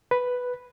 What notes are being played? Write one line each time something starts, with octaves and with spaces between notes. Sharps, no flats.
B4